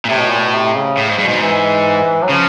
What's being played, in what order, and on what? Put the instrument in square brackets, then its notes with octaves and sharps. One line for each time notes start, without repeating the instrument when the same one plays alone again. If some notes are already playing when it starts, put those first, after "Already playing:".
[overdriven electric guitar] A#2
[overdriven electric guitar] A2 [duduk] C3
[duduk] B2
A#2
B2
C3
C#3
[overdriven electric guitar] A2
G#2
[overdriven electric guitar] G2 [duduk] B2
[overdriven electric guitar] G#2
[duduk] E3
F#3
[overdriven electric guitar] C#3 [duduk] F3